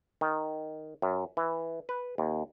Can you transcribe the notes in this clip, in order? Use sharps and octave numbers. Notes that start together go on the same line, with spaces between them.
D#3
F#2
E3
B4
D#2